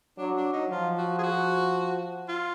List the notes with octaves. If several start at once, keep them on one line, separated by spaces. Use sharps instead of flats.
F#3 D4
D4
D#4
F3 F4
F#4
G#4
F#4
F4